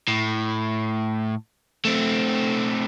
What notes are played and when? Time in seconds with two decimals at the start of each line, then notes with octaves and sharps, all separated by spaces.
0.08 A2
1.85 A3 C4